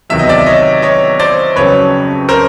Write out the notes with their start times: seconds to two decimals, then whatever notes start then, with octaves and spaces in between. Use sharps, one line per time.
0.10 E2 C3 D#3 F#3 E5
0.19 D#5
0.29 D5 E5
0.46 C#5 D#5
0.82 C#5 D#5
1.19 C5 D5
1.56 F2 C#3 F#3 B4 C#5
2.29 A#4 C5